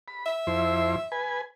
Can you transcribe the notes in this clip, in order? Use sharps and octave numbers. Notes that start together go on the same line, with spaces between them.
B5
E5
F2 E4 C5
B4 G#5